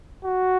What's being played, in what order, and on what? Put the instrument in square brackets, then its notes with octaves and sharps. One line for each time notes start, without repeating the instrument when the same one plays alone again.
[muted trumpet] F#4